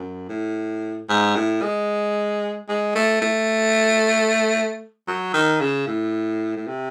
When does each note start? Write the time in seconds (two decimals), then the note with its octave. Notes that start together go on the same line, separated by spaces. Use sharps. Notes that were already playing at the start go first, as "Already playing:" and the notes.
Already playing: F#2
0.29 A2
1.09 G#2
1.36 A2
1.63 G#3
2.68 G#3
2.95 A3
3.21 A3
5.08 F#3
5.34 D#3
5.61 C#3
5.87 A2
6.56 A2
6.68 C3